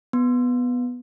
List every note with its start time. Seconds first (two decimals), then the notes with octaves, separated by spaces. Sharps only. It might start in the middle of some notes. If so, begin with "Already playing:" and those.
0.13 B3